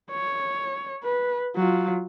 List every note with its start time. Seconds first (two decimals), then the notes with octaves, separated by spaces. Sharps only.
0.11 C#5
1.04 B4
1.56 F#3 F4